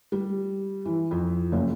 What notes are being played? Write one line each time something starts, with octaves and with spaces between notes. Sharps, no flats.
G3
E3
F2
F#1